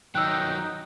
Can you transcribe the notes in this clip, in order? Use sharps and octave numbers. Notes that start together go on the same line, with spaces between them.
D#3 F#3 D#4 G5 E6 F#6